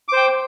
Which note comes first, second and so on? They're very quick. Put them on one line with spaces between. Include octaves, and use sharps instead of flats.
D6 C5 G5